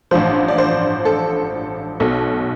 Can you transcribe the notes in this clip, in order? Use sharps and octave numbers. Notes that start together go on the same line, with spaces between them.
A1 G2 F3 C5
D5
C5
A4
B1 B2 A4